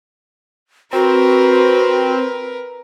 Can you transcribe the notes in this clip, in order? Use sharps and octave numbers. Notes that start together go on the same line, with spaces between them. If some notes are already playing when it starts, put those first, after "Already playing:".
C4 F#4 A#4 B4